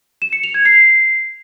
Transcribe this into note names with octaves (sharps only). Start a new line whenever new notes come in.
E7
C#7
F7
G#6
C7